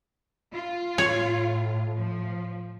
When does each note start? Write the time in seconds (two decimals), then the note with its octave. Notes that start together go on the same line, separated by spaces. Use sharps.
0.54 F4
0.98 A2 C#5
1.99 F3